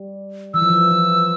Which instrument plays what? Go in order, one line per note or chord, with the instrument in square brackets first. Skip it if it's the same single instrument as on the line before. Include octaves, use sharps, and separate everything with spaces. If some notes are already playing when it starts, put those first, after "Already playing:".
Already playing: [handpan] G3
[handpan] E3 [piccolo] E6
[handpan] F3
E3
E3